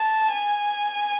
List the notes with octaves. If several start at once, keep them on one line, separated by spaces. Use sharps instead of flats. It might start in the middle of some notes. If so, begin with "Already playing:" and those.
Already playing: A5
G#5